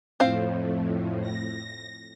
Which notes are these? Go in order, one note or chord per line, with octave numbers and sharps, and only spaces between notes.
F2 A2 C4 C5 F5
A#6